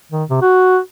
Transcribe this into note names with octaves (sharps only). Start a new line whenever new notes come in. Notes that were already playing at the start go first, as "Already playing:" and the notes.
D#3
C3
F#4